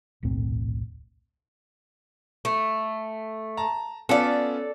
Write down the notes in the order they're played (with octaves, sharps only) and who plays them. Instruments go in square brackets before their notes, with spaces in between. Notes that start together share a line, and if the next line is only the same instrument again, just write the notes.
[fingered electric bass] D#1 B1 A2 C4
[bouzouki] A3
[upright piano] A5 A#5
[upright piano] B3 C#4 F4 [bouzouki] A4 D5